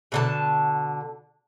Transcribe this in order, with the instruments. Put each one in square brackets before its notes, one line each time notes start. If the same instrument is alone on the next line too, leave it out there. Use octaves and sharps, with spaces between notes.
[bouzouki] B2 D3 A5